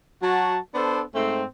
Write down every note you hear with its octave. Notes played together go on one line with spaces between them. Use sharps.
F#3 F#4 A5
B3 D4 A4 C5
G#2 A3 C4